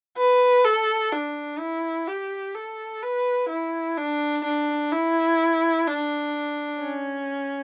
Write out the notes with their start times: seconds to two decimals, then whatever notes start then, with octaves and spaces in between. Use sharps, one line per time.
0.18 B4
0.65 A4
1.13 D4
1.59 E4
2.08 G4
2.55 A4
3.02 B4
3.49 E4
3.97 D4
4.44 D4
4.92 E4
5.87 D4
6.81 C#4